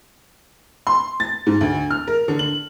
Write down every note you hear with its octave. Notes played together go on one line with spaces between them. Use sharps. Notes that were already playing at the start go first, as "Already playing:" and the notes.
C6
A6
G#2
D2
F6
A#4
D3
F#7